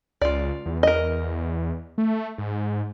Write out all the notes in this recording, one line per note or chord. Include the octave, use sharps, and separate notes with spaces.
C#2 F4 D5
E2
A#4 D#5
A3
G#2